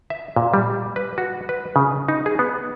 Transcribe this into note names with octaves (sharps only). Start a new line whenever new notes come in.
E5
A#2
G3
B4
F#4
B4
C#3
D#4
G#4
B3